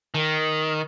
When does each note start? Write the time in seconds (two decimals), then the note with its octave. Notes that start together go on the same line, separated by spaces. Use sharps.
0.15 D#3